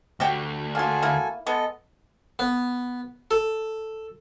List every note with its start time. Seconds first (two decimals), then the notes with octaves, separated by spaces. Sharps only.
0.20 D2 A3 F#4 G4 G5
0.75 A#3 F4 F#4 A4 G#5
1.03 A#3 E4
1.47 G#3 B3 A4 D#5
2.39 B3
3.31 A4